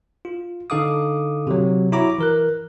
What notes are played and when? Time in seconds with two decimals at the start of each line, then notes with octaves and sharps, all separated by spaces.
0.25 F4
0.70 D3 D#4 A4 F5 D6 D#6
1.47 C3 F#3
1.92 E4 F#4 C#5 A#5 D6
2.18 E3 A#4 F#6